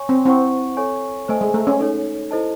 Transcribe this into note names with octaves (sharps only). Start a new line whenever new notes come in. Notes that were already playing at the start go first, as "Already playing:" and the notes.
Already playing: C#5 G#5 C#6
C4
C4 E4 C5 F#5 C#6
A4 C#5 G#5 C#6
A3 C5 D#5 G#5
G#3
A3
C#4
D#4 A4 C#5
E4 A4 C5 D#5 A5